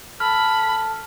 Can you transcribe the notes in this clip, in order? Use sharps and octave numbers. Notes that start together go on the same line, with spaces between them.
A4 B5 F6